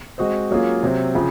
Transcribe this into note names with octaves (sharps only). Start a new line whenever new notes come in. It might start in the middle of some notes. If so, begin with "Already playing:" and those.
G#3 C4 F#4 C5 D#5
F#3 A#3 C#4 F4 G#4
C3 F#3 C4
C#3 F3 C4